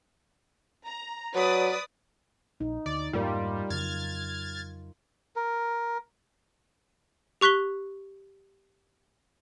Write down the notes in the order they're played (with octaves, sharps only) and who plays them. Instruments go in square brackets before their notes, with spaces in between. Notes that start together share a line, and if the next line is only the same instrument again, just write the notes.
[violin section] A#5
[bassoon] F#3 [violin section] B4 D5 D#6
[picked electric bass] A#1 [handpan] D#4
[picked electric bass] D2 [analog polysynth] D5
[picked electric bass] F2 G#2 A#3 [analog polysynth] G3 [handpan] F4 A#4
[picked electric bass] F2 C#3 F#3 [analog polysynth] F6 G#6 A6
[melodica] A#4
[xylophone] G4 C#6 F#6 B6 G7